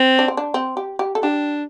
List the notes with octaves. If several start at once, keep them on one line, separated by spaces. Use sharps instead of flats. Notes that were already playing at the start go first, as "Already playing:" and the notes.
Already playing: C4
D4
C4
D4
C4
G4
G4
A4
D4 G4